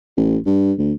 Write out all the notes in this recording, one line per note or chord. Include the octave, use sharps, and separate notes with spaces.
A1
G2
D2